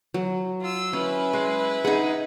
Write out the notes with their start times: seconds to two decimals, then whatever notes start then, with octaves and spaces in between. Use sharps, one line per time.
0.14 F#3
0.61 F4 E6
0.93 C#4 E4 B4
1.33 G#3
1.85 D#4 G#4 F#5